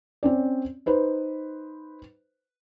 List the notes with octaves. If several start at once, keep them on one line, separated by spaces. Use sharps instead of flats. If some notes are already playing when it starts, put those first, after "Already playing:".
C4 C#4 D5
D#4 B4 C5